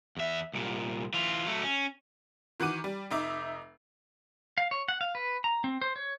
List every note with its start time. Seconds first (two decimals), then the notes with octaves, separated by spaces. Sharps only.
0.17 E2 E5
0.53 C2 A#2
1.14 E3 F4
1.47 F#3 A3
1.63 C#4
2.60 D#3 E3 F#4 D6 D#7
2.84 G3
3.11 F1 D#4 E5 D6
4.58 F5
4.71 C#5
4.88 F#5
5.01 F5
5.15 B4
5.44 A#5
5.64 C4
5.81 C5
5.96 C#5